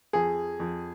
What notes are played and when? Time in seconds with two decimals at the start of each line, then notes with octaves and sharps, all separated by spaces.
0.13 F2 G#4
0.60 F2